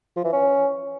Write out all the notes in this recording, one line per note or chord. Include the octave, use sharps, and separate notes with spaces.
F3
E3
C#4